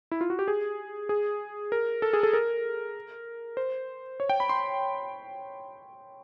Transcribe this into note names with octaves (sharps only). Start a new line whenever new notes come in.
E4
F4
F#4
G4
G#4
G#4
A#4
A4
G#4
A4
A#4
C5
C#5
G5
B5
C6